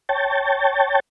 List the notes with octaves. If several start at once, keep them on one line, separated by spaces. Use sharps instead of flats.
C#5 G5 A5